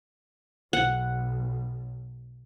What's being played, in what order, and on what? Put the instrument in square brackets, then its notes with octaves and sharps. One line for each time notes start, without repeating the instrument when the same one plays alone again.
[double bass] B1 [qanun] F#5